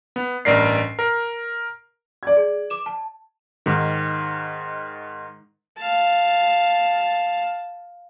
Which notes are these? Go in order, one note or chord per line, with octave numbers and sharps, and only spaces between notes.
B3
A1 G2 A#4 D5 C7
A#4
D5 G#6
G#4
D6 E7
A5
G#2 D#3
F5 A5